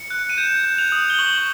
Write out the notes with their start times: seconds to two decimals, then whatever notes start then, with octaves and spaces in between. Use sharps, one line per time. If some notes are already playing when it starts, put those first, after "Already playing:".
Already playing: C#7
0.10 F#6
0.30 D#7
0.38 G6 E7
0.64 G6
0.78 F7
0.92 D#6
1.10 G7
1.19 C#6 F#7